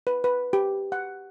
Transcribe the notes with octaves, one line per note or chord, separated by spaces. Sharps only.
B4
B4
G4
F#5